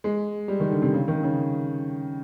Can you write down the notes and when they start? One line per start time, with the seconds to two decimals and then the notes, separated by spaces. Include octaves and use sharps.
0.04 G#3
0.48 G3
0.60 D#3
0.71 D3
0.82 C3
0.94 C#3
1.08 D#3
1.23 C#3